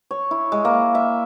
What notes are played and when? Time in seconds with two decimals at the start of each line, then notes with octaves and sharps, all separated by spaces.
0.11 C#5
0.31 E4
0.52 G#3
0.65 A#3
0.95 E5